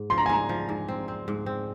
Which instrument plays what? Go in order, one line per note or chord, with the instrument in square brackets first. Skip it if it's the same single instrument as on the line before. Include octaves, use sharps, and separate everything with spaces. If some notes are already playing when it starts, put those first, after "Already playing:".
Already playing: [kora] G#2
[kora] F3 [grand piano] C6
[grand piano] A#5
G#5
[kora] G#2 [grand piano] A#5
[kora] F3
G#2
C4
C4
G#2
C4